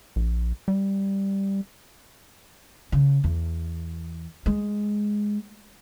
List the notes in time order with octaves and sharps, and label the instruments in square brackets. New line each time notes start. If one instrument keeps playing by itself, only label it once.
[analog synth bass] A#1
G3
[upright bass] C#3
E2
G#3